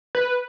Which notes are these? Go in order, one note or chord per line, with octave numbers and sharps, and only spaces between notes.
B4